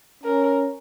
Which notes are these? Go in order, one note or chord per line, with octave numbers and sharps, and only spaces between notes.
C#4 A#4